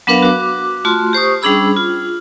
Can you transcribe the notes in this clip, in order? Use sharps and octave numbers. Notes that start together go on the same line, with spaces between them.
F#3 B3 D4 A#4 B4 F5
F#4 D6
A3 F4 F#4 C6
G4 C5 C#6 D#6
G3 C#4 D4 G#4 B5 E6
F4